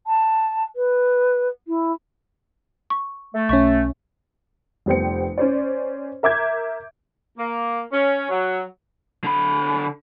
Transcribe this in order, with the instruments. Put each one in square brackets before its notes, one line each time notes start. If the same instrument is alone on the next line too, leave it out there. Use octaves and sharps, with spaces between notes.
[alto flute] A5
B4
E4
[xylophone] C#6
[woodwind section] A3
[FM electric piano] B1 C#4 [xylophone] C#5 E5 C#6
[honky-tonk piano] F1 G3 B3 C5 G5 C#7
C#4 C5 D5
A#4 E5 D6 G6 G#6
[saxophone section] A#3
C#4
F#3
[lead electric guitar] D3 B5